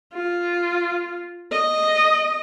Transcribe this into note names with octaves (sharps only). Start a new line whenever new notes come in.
F4
D#5